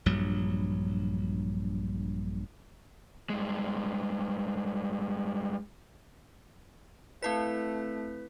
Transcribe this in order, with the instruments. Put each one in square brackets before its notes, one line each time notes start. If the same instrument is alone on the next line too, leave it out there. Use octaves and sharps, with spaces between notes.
[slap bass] A#1 G2 F#3
[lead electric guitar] G2 G#3
[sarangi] A3 [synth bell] C4 E4 B6 [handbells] B4